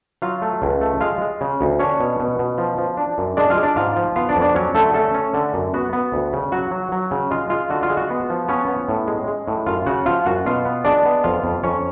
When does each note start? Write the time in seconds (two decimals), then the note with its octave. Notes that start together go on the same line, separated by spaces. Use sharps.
0.22 F#3 F4 F5
0.42 A3
0.62 C#2
0.81 A3
1.01 G#3 F4 F5
1.21 G#3
1.41 C#3
1.61 D2
1.79 C#4 D4 C#5
2.00 B2
2.20 B2
2.39 B2
2.58 F3
2.78 F3
2.97 D4
3.18 F#2
3.37 G#3 D4 D5
3.50 F4 F5
3.57 G#3
3.63 D4 D5
3.76 G#2 F4 F5
3.96 F3
4.16 B3 F4 F5
4.29 D4 D5
4.36 F2
4.42 D4 D5
4.55 F#3 C#4 C#5
4.75 D3 A3 A4
4.94 A3 C#4 A4
5.14 C#4
5.34 D3
5.54 F#2
5.74 B3 F#4
5.93 B3
6.12 D2
6.33 C#3
6.52 F#3 F#4
6.71 F#3
6.92 F#3
7.11 C#3
7.31 G#3 F4
7.50 G#3 F4
7.70 D3 F#4
7.83 F4
7.89 G#3
7.97 F#4
8.10 B3
8.30 F3
8.48 B3 C#4 C#5
8.68 B3
8.88 A2
9.08 G#3
9.28 G#3
9.48 A2
9.66 F#2 F4 F5
9.86 C#3 F#4 F#5
10.06 F3 F4 F5
10.26 F#2 F#4 F#5
10.46 B2 F4 F5
10.65 B3
10.85 G#3 D4 D5
11.05 B3
11.24 F2 F4 F5
11.44 F2
11.64 F2 C#4 C#5